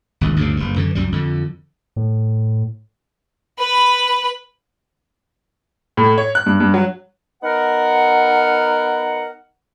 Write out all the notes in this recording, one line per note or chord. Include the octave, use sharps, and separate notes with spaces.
G#1 C#2
D2 G2 C#3
F#1 G2
F#2 D3 E3
C2 F#2 G3
F2 D3
A2
B4 B5
A2
C#5
F#6
G2
G2
F#3
B3 D#4 A#4 F#5